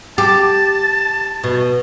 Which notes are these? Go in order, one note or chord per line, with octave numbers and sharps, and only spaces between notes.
G4 A5
B2